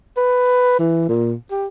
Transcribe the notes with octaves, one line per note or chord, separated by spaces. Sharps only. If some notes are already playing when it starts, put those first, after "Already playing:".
B4
E3
A#2
G4